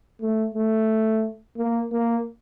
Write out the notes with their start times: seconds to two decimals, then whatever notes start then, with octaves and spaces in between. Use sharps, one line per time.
0.21 A3
0.54 A3
1.57 A#3
1.92 A#3